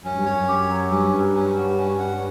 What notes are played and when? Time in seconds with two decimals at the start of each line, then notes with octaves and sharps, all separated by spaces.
0.04 F#2 C#4
0.15 G2
0.26 F#2 C#5
0.48 G4
0.69 F#3
0.91 G2 C#4
1.12 F#3
1.34 C#4
1.56 F#4
1.77 C#4
1.99 F#5